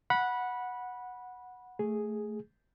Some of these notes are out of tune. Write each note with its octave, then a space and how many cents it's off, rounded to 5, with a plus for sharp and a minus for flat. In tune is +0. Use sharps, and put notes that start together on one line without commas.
F#5 -10 B5 -15
A3 +0 G#4 +0